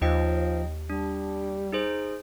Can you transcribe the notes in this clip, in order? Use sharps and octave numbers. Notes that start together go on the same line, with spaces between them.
D#2 F3 D#4 D#5 G5
G3 D4
D#4 G#4 C5